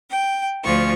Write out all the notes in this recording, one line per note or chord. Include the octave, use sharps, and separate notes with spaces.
G5
D2 F3 F4 C#6